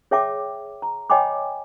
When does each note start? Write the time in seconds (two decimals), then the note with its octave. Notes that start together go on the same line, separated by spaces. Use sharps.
0.11 G#4 C#5 E5 G5 A5 D6
0.82 A#5
1.10 C#5 D#5 G5 G#5 B5 D6